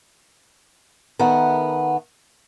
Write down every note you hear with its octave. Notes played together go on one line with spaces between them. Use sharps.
D#3 B3 A4 A#4 E5 F#5